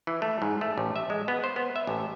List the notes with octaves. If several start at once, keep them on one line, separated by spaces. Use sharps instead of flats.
E3
A3
G#2
A3
A1
E5
G#3
B3
C5
B3
E5
A1